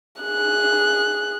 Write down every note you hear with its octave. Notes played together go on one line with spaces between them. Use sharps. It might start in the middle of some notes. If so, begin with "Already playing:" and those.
G#4 F#6